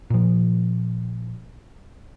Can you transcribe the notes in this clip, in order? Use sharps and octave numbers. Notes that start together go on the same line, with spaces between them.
A#2 F3